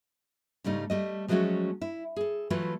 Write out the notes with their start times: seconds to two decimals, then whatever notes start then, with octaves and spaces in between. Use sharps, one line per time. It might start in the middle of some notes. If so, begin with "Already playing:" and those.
0.64 G#2 C#3 G3 A3 D#4
0.90 G3 A3 D#5
1.28 F3 F#3 G#3 A3 C#4 F#4
1.81 E4
2.16 G#4 A4
2.50 E3 F#3 A3 F4 F#4 B4